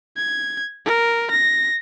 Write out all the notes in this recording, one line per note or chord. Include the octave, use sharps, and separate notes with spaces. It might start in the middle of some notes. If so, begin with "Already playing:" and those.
G#6
A#4
A#6